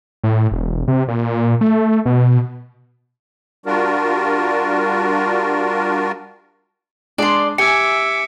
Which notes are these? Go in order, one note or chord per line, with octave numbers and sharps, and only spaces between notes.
A2
E1
C3
A#2
A3
B2
G3 D4 F4 F#4 A#4
G#3 D4 D5 C6
G4 E5 G#5 D6 C#7